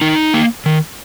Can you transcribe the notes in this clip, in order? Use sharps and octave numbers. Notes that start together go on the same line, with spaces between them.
D#3 D#4
A#3
D#3